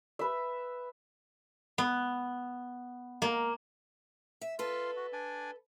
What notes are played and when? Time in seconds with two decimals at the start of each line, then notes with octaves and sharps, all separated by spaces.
0.19 B4 E5
1.78 B3
3.22 A#3
4.41 E5
4.59 F4 A4 B4 C6
4.96 F#4
5.13 D4 D5 G#5